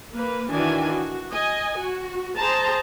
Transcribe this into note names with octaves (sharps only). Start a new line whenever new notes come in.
A#3 B4
D#3 E3 D4 F#4 G#5
F#4
D#5 G#5
F#4
G#4 C5 A5 A#5